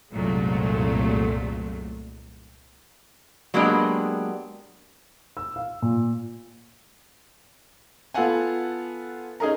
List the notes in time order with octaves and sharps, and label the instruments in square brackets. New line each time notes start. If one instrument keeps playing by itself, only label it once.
[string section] C2 F#2 A#2 F#3 G#3 A3
[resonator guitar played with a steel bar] F#3 G#3 A#3 B3 D4 G4
[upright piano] E6
F5
A#2
[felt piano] B3 F4 A4 F5 F#5 G#5
C#4 D#4 G#4 A#4 A#5